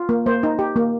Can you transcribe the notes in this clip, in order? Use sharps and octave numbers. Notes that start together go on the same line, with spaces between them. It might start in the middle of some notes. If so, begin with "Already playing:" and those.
Already playing: F4
A#3
A#3 C5
D#4
G4
A#3